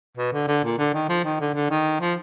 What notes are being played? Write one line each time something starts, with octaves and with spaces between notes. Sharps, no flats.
B2
D3
D3
A#2
D3
D#3
F3
D#3
D3
D3
D#3
F3